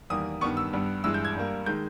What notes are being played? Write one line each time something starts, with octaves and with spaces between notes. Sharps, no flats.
E2 D#3 G3 A#3 D#6
G2 D#3 G3 B3 C#6
E6
G2 G3 B3
G2 E3 G#3 E6
G6
G#6
G2 G3 A#3
D#3 G#3 G6